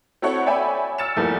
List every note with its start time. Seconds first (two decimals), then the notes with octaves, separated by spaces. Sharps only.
0.22 C4 E4 F#4 A4 C#5 F#5
0.46 C#5 D5 E5 G5 G#5 B5
0.98 E6 F6 A6 C#7 E7
1.16 E2 E3 F3 G3 A3 A#3